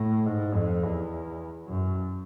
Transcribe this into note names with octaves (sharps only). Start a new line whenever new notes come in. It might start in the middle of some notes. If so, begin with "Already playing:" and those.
Already playing: A2
G#2
F2
E2
F#2